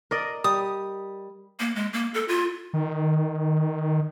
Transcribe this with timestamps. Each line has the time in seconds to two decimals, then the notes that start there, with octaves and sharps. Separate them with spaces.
0.11 A#4 D5 D#5
0.44 G3 D#6
1.60 A#3
1.76 G#3
1.93 A#3
2.14 A4
2.28 F4
2.73 D#3